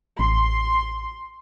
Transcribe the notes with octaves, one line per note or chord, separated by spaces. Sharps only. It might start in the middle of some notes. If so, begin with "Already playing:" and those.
A1 C6